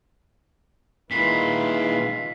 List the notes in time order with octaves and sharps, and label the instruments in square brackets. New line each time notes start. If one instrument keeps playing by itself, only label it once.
[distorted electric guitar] A#2 D#3 [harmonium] G#3 E4 B4 [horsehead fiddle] F4 [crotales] B6 C7